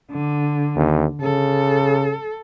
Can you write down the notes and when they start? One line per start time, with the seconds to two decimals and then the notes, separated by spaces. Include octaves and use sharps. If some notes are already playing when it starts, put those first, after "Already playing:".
0.12 D3
0.76 D#2
1.21 C#3 A4